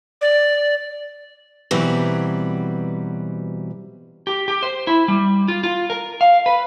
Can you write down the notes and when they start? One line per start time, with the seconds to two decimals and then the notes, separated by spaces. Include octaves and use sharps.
0.22 D5
1.71 B2 E3 F#3 G3 C4 B4
4.27 G4
4.48 G4
4.63 C5
4.87 E4
5.08 G3
5.48 F4
5.64 F4
5.90 A#4
6.21 F5
6.46 B4